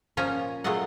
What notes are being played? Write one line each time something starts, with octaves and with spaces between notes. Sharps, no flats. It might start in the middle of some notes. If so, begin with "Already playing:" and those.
A#2 F3 C#4 G#5 A#5
A#2 F#3 G#3 A3 D#5 F#5